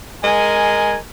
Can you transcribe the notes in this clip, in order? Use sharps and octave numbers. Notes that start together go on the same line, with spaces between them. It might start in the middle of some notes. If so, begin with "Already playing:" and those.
G#3 A#4 G#5